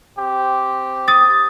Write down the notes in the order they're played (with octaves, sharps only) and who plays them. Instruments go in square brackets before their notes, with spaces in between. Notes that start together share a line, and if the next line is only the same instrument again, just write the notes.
[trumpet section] C4 G4
[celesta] D#6 A6